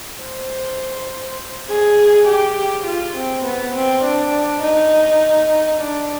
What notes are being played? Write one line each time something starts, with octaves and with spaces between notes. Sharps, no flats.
C5
G#4
G4
F4
C4
B3
C4
D4
D#4
D4